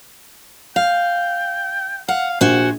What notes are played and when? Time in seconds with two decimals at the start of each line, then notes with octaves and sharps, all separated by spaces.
0.76 F5 G5
2.08 F5 F#5
2.41 A#1 F#4 C5 G#5